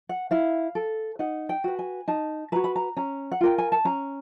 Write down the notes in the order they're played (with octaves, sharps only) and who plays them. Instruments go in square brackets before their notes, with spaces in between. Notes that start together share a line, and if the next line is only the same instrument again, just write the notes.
[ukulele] F#5
E4 F5
A4
D#4 F#5
G5
F#4 B4
G#5
D#4 A5
F#4 B4 A#5
B5
A#5
C#4 A#5
F#5
F4 A#4 G5
G#5
A5
C#4 A#5